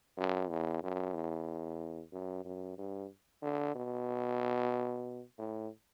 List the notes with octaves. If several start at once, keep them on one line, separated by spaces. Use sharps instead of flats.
F#2
E2
F#2
E2
F#2
F#2
G2
D3
B2
A2